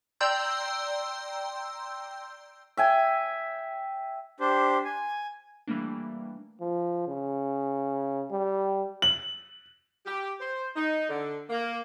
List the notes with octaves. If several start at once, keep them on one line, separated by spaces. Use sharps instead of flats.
D5 G5 A#5 C6 E6 G6
E5 G5 G#5
D4 G4 C5
G#5
E3 G3 A3 A#3 D4
F3
C#3
G3
F#7
G4
C5
D#4
D3
A#3